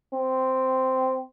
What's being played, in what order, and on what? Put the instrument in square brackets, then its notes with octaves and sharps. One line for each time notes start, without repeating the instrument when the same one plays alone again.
[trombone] C4